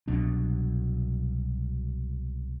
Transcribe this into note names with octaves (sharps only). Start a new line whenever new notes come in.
C2 B2 F#3 D4